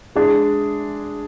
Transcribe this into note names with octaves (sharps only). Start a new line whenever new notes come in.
G#3 D4 G#4